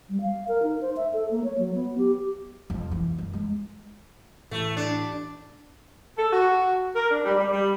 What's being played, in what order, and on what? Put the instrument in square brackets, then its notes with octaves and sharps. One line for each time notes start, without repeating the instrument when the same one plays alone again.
[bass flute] G3
F5
A#4
D#4
C5
E5
A4
A#3
C#5
F#3
B3
G4
[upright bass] F2
E3
F#2
G#3
[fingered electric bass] A2 E3 [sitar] A3
[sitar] D4
[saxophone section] A4
F#4
A#4
D4
G3
G3
G3